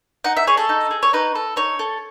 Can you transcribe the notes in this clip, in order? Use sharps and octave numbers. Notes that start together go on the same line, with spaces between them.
D#4 F#5
E5
G#4 C#5
A4
D#4
G#4
C#5
D#4 B4
A4
D#4 C#5
A4